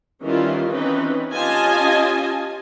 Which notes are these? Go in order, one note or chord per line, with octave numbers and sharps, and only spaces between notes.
D#3 E3 G3 C#4 E4 F4
E3 C4 C#4 D#4 B4
C#4 F4 G4 D#5 G#5 A5